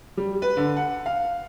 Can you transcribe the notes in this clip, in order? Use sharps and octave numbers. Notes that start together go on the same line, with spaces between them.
G3
B4
D3
F#5
F5